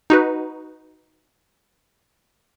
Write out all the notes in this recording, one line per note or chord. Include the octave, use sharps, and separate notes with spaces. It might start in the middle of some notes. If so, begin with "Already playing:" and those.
D#4 F#4 B4